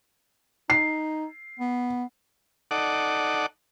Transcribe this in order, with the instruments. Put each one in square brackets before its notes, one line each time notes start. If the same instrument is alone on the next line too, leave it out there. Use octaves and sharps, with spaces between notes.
[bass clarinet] D#4 [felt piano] C7
[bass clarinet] B3
[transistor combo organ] D#4 A4 D5 F#5